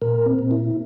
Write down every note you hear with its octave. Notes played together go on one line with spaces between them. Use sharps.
A#2 A#4
C4
A#2
E4